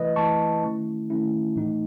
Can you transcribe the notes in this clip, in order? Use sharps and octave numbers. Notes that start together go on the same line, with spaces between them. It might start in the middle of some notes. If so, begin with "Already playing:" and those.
Already playing: E3 A3 E4 B4 D#5
E3 A3 E4 A5 C#6
D#3 A3 C#4 E4
D#3 A3 C#4 E4
A2 E3 A3 D#4